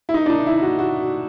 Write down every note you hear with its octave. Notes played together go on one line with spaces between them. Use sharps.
E4
D#4
D4
D#4
E4
F#4
F#4